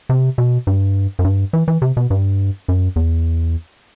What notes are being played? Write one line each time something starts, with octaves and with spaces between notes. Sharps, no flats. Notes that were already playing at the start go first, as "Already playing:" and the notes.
C3
B2
G2
F#2
G2
E3
E3
C3
B2
G2
F#2
E2